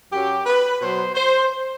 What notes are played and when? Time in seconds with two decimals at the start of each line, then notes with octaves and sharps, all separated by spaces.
0.12 F#2 F#3 G4
0.46 B4
0.80 B2 F#3 C5
1.14 C5